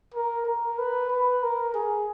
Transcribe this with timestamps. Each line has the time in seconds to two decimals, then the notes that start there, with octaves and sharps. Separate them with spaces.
0.14 A#4
0.46 A#4
0.79 B4
1.11 B4
1.43 A#4
1.74 G#4